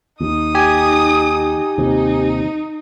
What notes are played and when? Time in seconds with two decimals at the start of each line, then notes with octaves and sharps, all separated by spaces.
0.20 D#2 D#4 D#6
0.55 G4 G#5
1.78 D#2 C3 D#4